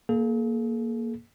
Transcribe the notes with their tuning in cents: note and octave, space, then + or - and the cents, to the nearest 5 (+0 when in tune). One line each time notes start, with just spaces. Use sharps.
A#3 +0 G#4 +45